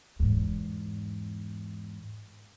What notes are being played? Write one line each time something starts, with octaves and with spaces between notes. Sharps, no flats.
E2 G#2